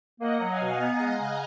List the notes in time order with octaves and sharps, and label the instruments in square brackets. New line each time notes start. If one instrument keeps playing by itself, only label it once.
[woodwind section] A#3 [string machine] D#5 F#5
[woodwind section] F#3
[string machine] F5 G#5
[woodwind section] B2
[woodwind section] B3 [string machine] F#5 A#5
[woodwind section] G#3
[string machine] F5 G#5
[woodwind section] C#3